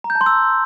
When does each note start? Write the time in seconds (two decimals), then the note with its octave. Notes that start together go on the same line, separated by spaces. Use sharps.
0.04 A#5
0.10 G6
0.15 A5
0.21 C6
0.26 E6